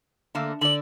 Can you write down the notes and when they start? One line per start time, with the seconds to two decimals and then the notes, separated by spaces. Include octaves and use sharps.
0.35 D3 A3 A#3
0.61 D3 D5 F#7